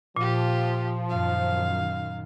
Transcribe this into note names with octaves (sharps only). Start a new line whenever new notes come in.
A#2 F3 F4 G4
F#2 D#3 F5